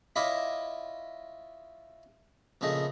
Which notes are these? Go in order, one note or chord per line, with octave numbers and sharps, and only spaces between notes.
E4 F4 C#5 D#5 B5 D6
A#1 C#3 A3 D#5